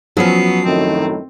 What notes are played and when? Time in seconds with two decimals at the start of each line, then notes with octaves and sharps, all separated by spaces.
0.17 F3 F#3 B3 C#4 C7
0.65 F#2 A2 D#3 C4